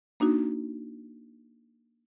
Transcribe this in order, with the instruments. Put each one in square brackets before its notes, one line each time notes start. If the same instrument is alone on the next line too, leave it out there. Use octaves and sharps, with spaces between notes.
[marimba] A#3 D4 D#4 F#4